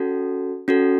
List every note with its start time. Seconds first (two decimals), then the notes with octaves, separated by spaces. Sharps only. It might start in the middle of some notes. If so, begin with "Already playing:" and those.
Already playing: C#4 F#4 A4
0.68 C#4 F#4 A4